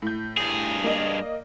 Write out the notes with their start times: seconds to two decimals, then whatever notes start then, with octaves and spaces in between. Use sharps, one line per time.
0.02 A2 G6
0.38 G2 G#4
0.84 A#3 D5 D#5